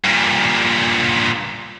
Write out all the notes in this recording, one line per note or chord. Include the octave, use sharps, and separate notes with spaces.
G2 A#2